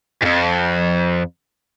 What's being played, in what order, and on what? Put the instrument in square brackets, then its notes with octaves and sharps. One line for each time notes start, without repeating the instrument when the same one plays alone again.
[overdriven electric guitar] F2 G#2